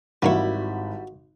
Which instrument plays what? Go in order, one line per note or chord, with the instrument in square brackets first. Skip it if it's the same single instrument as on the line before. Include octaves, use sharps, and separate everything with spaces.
[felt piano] G#1 [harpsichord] E3 A#3 C#6 [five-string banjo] G3 E4 [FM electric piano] F#4